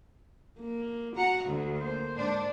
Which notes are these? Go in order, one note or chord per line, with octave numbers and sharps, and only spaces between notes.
A#3
F#4 F#5 A#5
D2
A#3 C5
G#2 D4